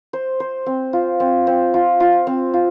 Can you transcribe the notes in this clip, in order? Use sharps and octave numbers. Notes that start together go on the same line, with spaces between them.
C5
C5
C4
F4
C4
C4
F4
F4
C4
F4